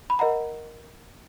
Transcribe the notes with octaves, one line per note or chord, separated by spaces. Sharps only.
B5
A#4 D#5 F#5 A#5